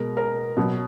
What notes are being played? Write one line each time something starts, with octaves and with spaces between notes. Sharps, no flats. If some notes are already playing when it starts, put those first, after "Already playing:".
Already playing: B2 G#3 A#4
A#4
B2 F#3